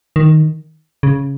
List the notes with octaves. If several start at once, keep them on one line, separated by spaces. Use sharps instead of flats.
D#3
C#3